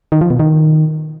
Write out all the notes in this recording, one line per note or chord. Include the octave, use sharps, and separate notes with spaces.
D#3
F3
B2
D#3